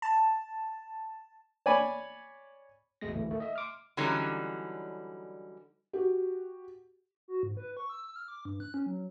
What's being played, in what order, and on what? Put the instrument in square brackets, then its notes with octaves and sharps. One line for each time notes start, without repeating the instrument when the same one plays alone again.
[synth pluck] A5
[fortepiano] C#5 D5 G#5 B5
[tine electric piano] A1 E2 B2 G#3 A3 A#6
A1 D2 E3 A3
D#3 A3
D#5 E5
C6 D6 F6
[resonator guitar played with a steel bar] D3 E3 F#3 G3 C#4 D#4
[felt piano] F#4 G4
[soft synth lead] F#4
G#2
B4
C#6
E6
E6
F6
D6
G2
F#6
C#4
F#3